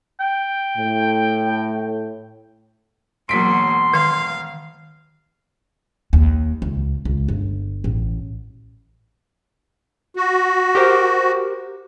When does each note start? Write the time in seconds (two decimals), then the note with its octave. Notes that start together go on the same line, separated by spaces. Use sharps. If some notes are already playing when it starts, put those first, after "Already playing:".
0.20 G5
0.77 A2
3.29 E1 F#3 A#3 C6 B6 D7
3.94 D#3 F5
6.13 D#2
6.62 C#2
7.05 C#2
7.28 G1
7.84 A1
10.16 F#4
10.75 G4 A#4 C5